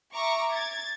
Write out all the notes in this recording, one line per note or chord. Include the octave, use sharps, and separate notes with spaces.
E5 A#5 C#6 D6
G#6 A6